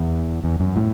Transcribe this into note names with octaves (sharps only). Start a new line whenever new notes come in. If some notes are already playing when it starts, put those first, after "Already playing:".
Already playing: E2
E2
F#2
A2